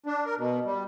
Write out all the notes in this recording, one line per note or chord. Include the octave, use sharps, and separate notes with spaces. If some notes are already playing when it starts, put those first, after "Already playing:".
D4
A#4
B2
G3